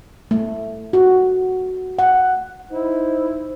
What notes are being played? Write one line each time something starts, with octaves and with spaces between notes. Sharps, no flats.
A3
F#4
F#5
D#4 E4 C5